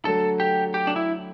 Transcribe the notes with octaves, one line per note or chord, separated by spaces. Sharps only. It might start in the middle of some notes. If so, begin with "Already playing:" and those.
D3 F#3 A3 A4
G4
G4
D4
E4